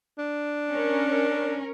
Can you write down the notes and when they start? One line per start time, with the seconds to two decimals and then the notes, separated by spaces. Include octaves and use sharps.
0.18 D4
0.71 C#4 A#4